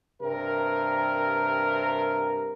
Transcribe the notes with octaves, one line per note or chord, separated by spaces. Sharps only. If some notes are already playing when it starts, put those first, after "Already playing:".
G2 C3 A#4